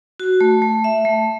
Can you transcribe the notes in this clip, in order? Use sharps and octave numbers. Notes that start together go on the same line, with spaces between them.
F#4
A3
A3
E5
A3